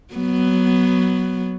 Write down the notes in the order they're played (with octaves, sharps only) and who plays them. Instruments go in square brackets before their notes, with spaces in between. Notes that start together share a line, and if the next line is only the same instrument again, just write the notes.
[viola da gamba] F#3 B3